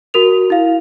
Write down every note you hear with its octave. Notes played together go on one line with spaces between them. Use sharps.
F#4 A#4 F7
E4 F5